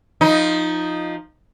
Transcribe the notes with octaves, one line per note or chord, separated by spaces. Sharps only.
F3 D#4